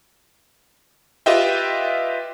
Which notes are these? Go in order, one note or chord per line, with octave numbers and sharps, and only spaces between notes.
F4 G4 B4 D#5 E5 G5